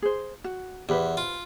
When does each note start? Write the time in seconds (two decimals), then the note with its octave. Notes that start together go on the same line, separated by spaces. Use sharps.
0.02 G#4 C5
0.44 F#4
0.89 E2 G4 B4 C5
1.17 F4